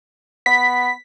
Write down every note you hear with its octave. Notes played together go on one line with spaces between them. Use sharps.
B3 B6